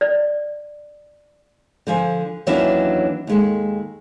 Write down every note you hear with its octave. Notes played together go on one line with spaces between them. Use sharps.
D5
D3 F3 G#5
D#2 E3 F#3 C#4 D4 E5
D#2 G#3 A4